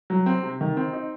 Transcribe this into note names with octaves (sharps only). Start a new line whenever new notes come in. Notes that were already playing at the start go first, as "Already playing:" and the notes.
F#3
C4
C3
D#3
C4
D#4